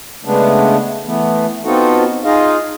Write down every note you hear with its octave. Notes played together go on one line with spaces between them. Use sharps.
C#3 G#3 A3 B3 D4
E3 A3 B3
B3 C4 D#4 F4 F#4 A4
D#4 F4 G#4 D#5 F5